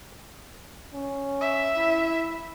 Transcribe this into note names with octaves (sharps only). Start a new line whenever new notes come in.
C#4
E5
E4